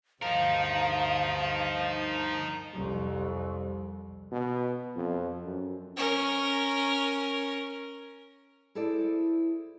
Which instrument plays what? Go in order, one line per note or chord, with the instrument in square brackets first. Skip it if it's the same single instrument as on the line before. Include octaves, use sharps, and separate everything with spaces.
[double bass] D2 G2 [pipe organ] F3 [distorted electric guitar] D#4 A#4 [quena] F5
[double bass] C2 F2
[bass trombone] B2
F2
F#2
[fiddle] C#4 A#4
[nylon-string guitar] E4 G#4 A4 C5 D5